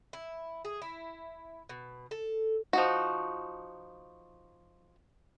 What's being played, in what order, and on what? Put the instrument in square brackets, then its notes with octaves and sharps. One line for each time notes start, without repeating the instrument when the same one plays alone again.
[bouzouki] E4
G#4
E4
B2
A4
[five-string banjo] F3 D#4 F#4